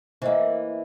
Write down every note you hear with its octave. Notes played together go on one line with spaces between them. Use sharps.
E3 A#3 C5 D#5